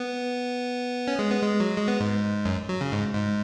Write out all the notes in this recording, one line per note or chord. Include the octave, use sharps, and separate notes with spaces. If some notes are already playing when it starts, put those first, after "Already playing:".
Already playing: B3
C#4
G#3
B3
G#3
F#3
G#3
B3
G#2
F#2
F#3
C#3
G#2
G#2